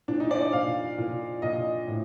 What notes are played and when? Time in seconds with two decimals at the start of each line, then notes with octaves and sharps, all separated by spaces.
0.08 A#2 D4
0.20 D#4
0.31 D5
0.42 D5
0.53 A#2 F5
0.98 A#2
1.42 A#2 D#5
1.87 A2